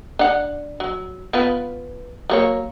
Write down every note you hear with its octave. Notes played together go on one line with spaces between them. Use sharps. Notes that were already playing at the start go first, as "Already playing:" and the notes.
D4 F#5
F#3
B3 F4 B4
F#3 A#3 C#5